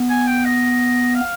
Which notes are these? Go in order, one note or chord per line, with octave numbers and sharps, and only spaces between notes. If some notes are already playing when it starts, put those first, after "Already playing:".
Already playing: B3
G#5
G5
D#5
F5